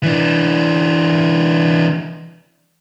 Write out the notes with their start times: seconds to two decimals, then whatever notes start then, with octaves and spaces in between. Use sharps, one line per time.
0.03 E3 D4